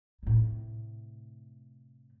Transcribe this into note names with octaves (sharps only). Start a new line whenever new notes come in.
A2 C3